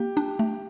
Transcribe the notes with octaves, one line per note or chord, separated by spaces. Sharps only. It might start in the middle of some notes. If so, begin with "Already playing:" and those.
Already playing: A#3 G4
D4
A3